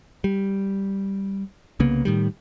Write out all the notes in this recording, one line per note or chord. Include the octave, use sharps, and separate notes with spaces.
G3
C2 C#3 A#3 B3
A2 D#3 G3